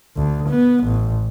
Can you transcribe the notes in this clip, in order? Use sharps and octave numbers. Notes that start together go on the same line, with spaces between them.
D2
B3
A1